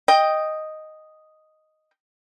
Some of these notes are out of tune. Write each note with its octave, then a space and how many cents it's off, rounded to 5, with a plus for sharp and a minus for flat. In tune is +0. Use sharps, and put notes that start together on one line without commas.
D#5 +0 G5 +10